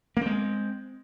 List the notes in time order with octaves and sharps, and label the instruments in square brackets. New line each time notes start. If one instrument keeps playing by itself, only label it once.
[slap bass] A#3
C4
G#3